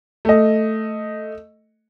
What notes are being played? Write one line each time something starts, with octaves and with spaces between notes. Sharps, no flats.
A3 D#5